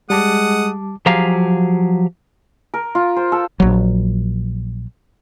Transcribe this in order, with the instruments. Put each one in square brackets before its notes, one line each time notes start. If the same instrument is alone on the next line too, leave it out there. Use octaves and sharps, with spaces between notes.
[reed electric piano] G3 A5 D6 [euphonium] G#3 [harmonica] F#5 D#6
[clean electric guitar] F3 F#3 G4 G#4 F5 A#5
[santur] A#4
F4
C5
A4
[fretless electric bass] A#1 F#3